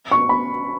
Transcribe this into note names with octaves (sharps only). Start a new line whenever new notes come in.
C#6
B5